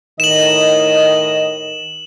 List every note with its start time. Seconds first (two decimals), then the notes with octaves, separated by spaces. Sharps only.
0.20 A2 D#3 D#5 E7 F#7